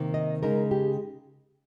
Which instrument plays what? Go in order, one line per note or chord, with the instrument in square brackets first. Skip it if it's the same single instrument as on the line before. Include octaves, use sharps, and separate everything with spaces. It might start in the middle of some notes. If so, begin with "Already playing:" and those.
Already playing: [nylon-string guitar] C3 D#3 A#3
D#5
C#3 G#3 D#4 A#4
G4